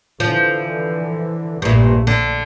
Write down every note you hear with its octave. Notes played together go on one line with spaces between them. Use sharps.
D3 E3 F3
A#1 G2 A#2 A3
D3